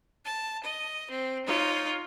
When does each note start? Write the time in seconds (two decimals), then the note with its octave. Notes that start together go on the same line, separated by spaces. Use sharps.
0.25 A5
0.63 D#5
1.10 C4
1.46 D#4 F4 C#5